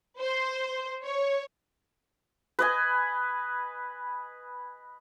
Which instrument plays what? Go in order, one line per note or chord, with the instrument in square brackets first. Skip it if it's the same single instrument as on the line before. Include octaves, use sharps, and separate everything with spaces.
[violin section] C5
C#5
[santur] B4 D#5 G#5